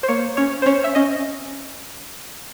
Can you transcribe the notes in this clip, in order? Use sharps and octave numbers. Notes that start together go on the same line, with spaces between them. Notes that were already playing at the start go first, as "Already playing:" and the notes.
C5
A#3 C#5
C#4 C#5
C5
C#4 C#5
E5
C#4 D#5